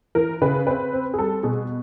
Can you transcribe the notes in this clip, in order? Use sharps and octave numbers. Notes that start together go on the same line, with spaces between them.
E3 A#4
C#3 B4
C4 B4
C4
G#4
G3 A4
B2 G#4